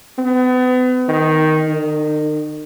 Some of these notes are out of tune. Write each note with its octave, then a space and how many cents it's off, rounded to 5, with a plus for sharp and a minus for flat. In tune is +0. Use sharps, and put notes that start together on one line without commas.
B3 +40
D#3 +5
D#3 -40